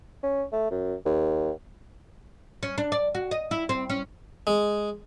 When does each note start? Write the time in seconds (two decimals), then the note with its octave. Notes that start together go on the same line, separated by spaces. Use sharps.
0.23 C#4
0.52 A3
0.71 F#2
1.06 D#2
2.63 C#4
2.78 D4
2.92 D5
3.15 F#4
3.31 D#5
3.51 E4
3.69 C4
3.90 C#4
4.47 G#3